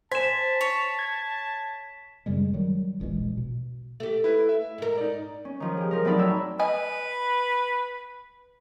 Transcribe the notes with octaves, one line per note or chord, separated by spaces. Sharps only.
C5 G#5 A5 B6 E7
C#5
G#6
F#2 C#3 G3 G#3
D#3 F#3 G3
E1 A#1 E3 G#3
B2
A3 G4
E4 B4
E5
G#2 A#4
D#4 D5
C#4
D#3 F3
G4 G#4
F3 A#4
A2 F#3 C4 D#4 D5 B5
A2 C#5 G5 E6
B4 D5 D#5 G#5